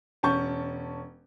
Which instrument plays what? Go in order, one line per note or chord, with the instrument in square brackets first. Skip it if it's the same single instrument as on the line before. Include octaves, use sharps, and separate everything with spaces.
[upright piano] E1 C#4 A5 C#6 G6